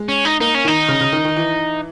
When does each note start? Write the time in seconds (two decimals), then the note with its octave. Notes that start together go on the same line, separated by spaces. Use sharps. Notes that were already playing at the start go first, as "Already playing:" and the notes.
Already playing: G#3
0.09 C#4
0.25 D#4
0.40 A#3 D#4
0.55 C#4
0.65 D#3 D#4
0.88 C#3
1.00 C#3
1.12 D#3
1.25 D#3
1.36 E3